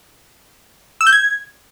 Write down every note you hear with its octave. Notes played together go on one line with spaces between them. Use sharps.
E6
G6
G#6